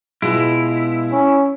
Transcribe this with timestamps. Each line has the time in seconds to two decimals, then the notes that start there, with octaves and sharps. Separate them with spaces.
0.22 B2 G#3 E4 F4
1.12 C#4